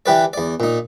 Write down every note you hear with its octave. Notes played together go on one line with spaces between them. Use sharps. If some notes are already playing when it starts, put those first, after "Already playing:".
E3 G4 B4 D5
E2 D5
A#2 D#4